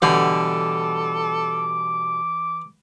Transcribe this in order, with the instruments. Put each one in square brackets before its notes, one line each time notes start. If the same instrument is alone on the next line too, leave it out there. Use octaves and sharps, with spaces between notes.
[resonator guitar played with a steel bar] B2 D3 G3 [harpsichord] E3 [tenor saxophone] A4 [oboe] D6